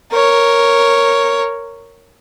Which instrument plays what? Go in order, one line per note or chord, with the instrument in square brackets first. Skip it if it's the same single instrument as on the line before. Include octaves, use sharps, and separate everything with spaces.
[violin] A#4 C#5